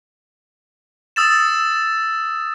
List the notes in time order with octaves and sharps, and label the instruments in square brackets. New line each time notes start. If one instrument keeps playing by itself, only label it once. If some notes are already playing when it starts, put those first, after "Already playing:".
[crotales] D#6 E6 A6 E7